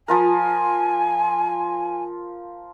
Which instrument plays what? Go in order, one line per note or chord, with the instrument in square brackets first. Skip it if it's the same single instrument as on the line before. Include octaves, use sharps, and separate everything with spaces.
[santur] F3 F4 A#4 [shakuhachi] G#5